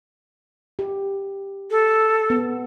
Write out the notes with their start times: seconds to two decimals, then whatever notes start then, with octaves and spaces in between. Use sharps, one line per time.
0.79 G4
1.71 A4
2.30 B3